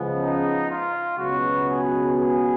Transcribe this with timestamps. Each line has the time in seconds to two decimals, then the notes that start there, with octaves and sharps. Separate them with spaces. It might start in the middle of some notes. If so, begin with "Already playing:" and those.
Already playing: C#2 C#3 F3 G#3 B3
0.18 D#4
0.67 F4
1.17 C#2 B2 F#3 B3 F#4
1.66 G#4
2.15 G#4